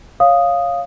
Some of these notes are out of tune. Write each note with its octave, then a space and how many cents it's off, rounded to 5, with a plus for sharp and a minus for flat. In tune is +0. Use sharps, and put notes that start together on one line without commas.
C#5 +0 F5 +0 D#6 +0